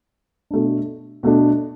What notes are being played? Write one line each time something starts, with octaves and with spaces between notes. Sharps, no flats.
B2 A3 D4
B2 A3 D4